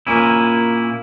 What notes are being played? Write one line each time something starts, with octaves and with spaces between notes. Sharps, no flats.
A#2 A#3 C#4 E4